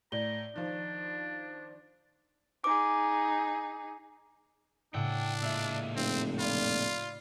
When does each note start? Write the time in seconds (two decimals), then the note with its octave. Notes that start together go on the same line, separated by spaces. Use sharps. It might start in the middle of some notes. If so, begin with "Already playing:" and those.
0.12 A2 D5 A#5 G7
0.56 D#3 F3 D4
2.64 D#4 G#4 D6
4.94 A2 C#3 D4 F#5 G5 E6
5.42 A#2 G#3 E5 F5 E6
5.96 F1 C4
6.39 F4 D5 F5 B5